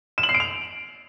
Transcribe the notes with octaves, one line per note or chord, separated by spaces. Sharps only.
E7
F#7
C7
D7
F7